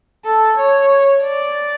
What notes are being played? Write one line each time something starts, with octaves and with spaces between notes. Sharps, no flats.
A4
C#5
D5